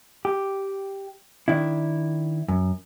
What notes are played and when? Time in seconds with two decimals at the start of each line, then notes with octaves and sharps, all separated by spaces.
0.25 G4
1.48 D#3 D4 E4
2.48 F#2